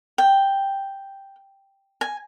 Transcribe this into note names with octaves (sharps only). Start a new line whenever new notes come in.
G5
G#5